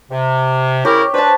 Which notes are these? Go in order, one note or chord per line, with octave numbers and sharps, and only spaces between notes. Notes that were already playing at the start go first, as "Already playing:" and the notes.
C3
C#3 E4 G4 A#4 C#5
D4 B4 C5 A5